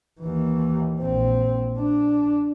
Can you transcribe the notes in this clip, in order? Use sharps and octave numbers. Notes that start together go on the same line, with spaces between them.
D#2 E3
A#1 C4
D4